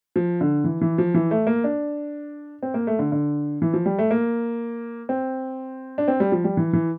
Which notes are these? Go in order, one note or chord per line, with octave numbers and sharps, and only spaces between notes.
F3
D3
E3
E3
F3
E3
A3
A#3
D4
C4
A#3
A3
D3
D3
E3
F3
G3
A3
A#3
C4
D4
C4
G3
F3
G3
E3
E3